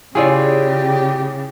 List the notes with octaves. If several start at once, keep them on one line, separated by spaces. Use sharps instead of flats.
C#3 E4 F4 G4 G#4 C#5 D5